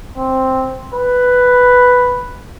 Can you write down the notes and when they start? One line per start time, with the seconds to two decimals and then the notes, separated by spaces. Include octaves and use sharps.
0.18 C4
0.94 B4